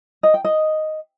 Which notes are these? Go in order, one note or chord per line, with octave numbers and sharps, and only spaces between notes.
D#5
G5
D#5